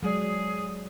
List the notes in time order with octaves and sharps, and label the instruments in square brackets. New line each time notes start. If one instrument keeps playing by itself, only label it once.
[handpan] F#3 D5 [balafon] G#3 [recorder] G#4